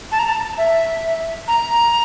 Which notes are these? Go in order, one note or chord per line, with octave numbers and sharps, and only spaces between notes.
A5
A#5
A5
E5
A#5